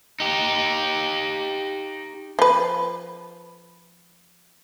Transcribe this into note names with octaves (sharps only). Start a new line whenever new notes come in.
D#4 G4
F3 B4